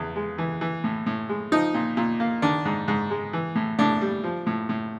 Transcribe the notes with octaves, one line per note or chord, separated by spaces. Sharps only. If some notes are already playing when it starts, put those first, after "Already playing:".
Already playing: E2 C#3
G#3
E3
E3
A2
A2
G#3
F3 D#4
A#2
A#2
A#3
D#3 D4
G#2
G#2
G#3
E3
A2
A2 D4
G3
F3
A2
A2